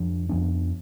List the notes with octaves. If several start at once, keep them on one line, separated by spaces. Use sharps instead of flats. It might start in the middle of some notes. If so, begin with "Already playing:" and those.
Already playing: F2 F3 D4
F2 F3 B3 D4